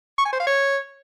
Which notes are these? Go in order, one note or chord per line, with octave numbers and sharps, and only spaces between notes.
C#6
G#5
C5
F5
C#5